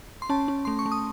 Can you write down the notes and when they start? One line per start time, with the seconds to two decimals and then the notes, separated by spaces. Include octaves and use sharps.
0.22 C6
0.29 C#4 A5
0.48 C#4
0.65 A3 C6
0.79 C#6
0.86 A3
0.92 D#6